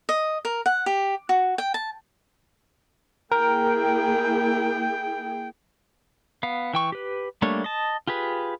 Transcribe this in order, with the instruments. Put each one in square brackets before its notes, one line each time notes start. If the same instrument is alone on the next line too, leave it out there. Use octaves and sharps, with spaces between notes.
[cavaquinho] D#5
A#4
F#5
G4
F#4
G5
A5
[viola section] A#3 E4 G#4 [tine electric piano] A#4 [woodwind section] G5
[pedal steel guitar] B3 F5
E3 G5 C#6
G4 B4
G3 A3 A#3 D4 C#5
D#5 A5
F4 G4 G#4 B4